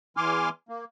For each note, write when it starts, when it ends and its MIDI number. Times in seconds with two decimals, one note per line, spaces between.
0.17 0.49 40
0.17 0.49 52
0.17 0.49 80
0.17 0.49 84
0.17 0.49 86
0.17 0.49 89
0.69 0.84 58